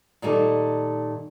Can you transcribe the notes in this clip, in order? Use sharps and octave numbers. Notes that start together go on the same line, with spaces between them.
A#2 D#3 G3 A3 A#3